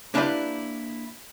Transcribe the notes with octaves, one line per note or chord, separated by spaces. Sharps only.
A#3 D4 E4 G4 B4 D5